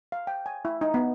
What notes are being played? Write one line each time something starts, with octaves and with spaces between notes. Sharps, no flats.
F5
G5
G#5
E4
D#4
B3